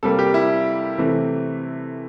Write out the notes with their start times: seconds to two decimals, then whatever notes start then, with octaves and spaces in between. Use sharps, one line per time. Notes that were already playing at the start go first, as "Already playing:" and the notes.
0.03 C3 G3 A#3 A4
0.19 G4
0.34 E4
0.98 C3 E3 A3